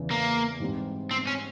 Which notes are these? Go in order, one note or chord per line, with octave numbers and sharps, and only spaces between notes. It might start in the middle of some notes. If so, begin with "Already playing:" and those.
Already playing: E2 C#3 E3
A#3
G#2 E3 G3 C4
C4
C#4